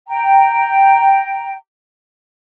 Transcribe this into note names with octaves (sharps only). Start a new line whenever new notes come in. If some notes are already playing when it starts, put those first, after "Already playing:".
G5 A#5